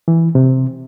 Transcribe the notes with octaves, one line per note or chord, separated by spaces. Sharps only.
E3
C3